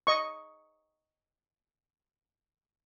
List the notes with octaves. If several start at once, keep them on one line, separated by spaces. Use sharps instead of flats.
D#5 C#6